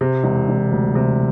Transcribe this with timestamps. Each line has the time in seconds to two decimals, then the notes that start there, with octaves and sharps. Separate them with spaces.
0.01 C3
0.24 E1
0.49 E1
0.72 D2
0.95 C3